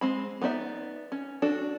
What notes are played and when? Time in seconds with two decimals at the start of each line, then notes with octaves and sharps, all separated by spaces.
0.01 G#3 C4 B5
0.42 B3 D#4 D5 E5
1.12 C#4
1.42 D4 F#4 A4